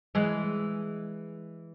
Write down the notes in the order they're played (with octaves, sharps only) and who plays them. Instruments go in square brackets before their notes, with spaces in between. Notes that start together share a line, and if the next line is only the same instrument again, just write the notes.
[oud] E3 G#3